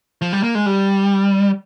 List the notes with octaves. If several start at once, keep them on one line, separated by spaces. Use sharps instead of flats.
F3
G3
A#3
G#3
G3